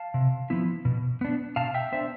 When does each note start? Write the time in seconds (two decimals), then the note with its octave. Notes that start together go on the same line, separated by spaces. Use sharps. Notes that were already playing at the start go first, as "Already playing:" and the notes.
Already playing: F5 A5
0.14 C3
0.50 F3 B3 E4
0.85 B2
1.21 B3 D4
1.56 B2 F5 A5
1.74 E5 G5
1.92 B3 D4 C5 E5